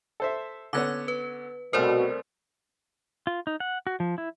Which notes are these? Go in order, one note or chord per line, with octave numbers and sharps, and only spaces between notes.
A4 C5 E5
D3 B3 C#4 D6 G#6
B4
C2 B2 A3 A#4 C5 D5 F6
F4
D#4
F#5
F#4
F3
E4